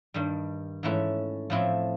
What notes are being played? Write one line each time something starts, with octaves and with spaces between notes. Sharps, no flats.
G2 D#3 G3
G#2 E3 A3 C#4 E4
A2 F3 A3 C4 E4